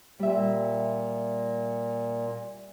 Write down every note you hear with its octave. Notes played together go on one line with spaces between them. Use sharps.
A#2 G3 E5